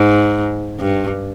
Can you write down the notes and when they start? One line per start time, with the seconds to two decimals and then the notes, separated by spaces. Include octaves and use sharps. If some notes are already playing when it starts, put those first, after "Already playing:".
Already playing: G#2
0.80 G2